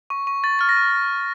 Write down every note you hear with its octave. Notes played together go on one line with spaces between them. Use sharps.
C#6
C#6
C#6 A6
F6 A6
A#6
C#6